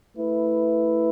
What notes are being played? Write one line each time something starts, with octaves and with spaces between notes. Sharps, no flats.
A3 E4 B4